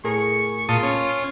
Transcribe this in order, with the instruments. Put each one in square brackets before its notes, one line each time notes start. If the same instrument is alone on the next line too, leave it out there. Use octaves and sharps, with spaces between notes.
[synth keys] A2 G#4 A#4 [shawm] C#6
[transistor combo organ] A#2 A5 D#6 [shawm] F4
[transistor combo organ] C#4